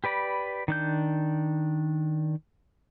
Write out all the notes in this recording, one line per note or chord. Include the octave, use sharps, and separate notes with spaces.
G4 B4 D5 B5
D#3 D4 G6